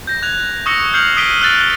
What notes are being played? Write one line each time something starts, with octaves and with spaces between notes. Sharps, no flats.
G6 A#6
F#6 G#6 F7
C#6 D#6 E6 A#6 C#7
F6 G6 C7 C#7 F7 F#7
D#6 F#6 B6 D7 D#7 G7
E6 F#6 A6